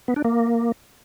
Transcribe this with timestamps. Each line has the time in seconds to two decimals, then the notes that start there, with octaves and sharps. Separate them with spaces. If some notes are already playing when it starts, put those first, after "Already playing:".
0.08 B3
0.16 D4
0.25 A#3